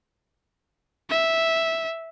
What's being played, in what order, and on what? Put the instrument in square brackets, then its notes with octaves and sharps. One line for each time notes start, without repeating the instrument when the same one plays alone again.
[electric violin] E5